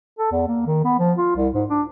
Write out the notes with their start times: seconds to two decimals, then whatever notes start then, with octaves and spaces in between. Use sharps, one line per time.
0.19 A4
0.32 E2
0.48 A#3
0.66 D#3
0.85 B3
0.99 F3
1.18 F4
1.36 C2
1.55 G#2
1.70 D4